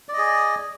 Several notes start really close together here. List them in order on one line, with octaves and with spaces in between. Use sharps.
D5 D#5 G#4